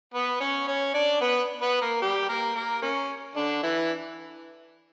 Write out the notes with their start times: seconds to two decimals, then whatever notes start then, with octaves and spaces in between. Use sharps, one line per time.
0.14 B3 B4
0.41 C#4 C#5
0.68 C#4 C#5
0.94 D4 D5
1.21 B3 B4
1.62 B3 B4
1.82 A#3 A#4
2.02 G3 G4
2.29 A#3 A#4
2.56 A#3 A#4
2.82 A#3 C#4
3.36 D3 D4
3.63 E3 E4